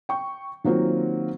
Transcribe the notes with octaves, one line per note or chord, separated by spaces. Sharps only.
G5 C#6
D#3 F#3 A#3 C4 F4